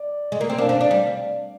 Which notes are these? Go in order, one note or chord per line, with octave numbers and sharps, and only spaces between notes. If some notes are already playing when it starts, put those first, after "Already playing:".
Already playing: D5
G#3
A#3
C4
D4 F5
D4
D4
G3